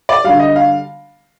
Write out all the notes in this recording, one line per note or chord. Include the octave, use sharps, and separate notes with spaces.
D5
D3 G3 F5
D#5
F5